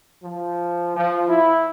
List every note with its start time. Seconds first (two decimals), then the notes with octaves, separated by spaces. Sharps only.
0.23 F3
0.96 F3
1.28 E4